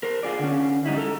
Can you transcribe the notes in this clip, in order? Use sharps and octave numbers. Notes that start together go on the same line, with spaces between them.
A#4 C5
F4 G#4 D5
D3 C#4
G#2 G3 D#4 E4
A4 A#5